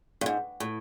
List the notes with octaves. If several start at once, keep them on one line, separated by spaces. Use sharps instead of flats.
G2
G#2
A2